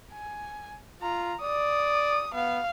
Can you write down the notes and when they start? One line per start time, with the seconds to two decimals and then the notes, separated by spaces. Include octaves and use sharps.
0.12 G#5
1.02 F4 A#5
1.42 D5 D#6
2.34 B3 F5